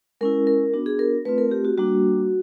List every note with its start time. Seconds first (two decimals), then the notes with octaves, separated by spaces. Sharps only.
0.21 G#3 C#4 E4 A#4
0.47 A#4
0.73 B3 D4 F#4
0.86 G#4
0.99 A#4
1.25 A3 C4 F4 B4
1.38 A#4
1.51 G4
1.65 F#4
1.78 G3 A#3 D4 F#4